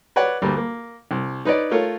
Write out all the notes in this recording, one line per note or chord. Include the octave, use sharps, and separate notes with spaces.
B4 C#5 D5 F#5
D2 G3 A#3
A#3
C2
D#4 B4 C#5 D5
A3 F4 A#4 C#5